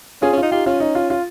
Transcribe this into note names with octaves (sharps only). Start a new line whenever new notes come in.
C#4 F4 G#4
C#4
D#4 F4
D#4 F4 G4
C#4 F4
D#4
F4
F4